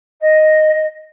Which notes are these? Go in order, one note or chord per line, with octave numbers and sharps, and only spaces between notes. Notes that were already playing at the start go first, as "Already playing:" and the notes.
D#5